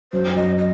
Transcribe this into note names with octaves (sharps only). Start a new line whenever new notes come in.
F#2 C5
F#2 D#5
D#5